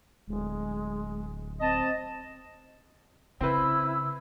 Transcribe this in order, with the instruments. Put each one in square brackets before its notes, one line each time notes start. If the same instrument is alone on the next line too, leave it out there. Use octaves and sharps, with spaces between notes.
[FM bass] D1 [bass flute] G#3
[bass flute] C4 [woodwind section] D#5 A5
[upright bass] C#3 [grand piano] C4 B4 [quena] E4 [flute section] E6